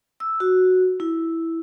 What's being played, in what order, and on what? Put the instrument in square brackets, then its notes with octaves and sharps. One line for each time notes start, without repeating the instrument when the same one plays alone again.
[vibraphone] E6
F#4
E4